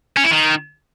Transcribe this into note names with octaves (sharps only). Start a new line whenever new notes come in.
C#4
E4
D#3